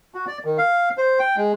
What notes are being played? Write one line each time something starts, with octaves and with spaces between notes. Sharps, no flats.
F#4
D5
D#3
F5
C5
G5
G#3